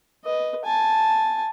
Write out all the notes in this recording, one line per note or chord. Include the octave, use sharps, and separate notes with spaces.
B4 D#5
G#5 A5